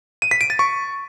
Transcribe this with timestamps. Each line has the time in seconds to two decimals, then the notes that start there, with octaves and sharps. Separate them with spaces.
0.22 D#7
0.31 B6
0.41 D7
0.50 A6
0.59 C#6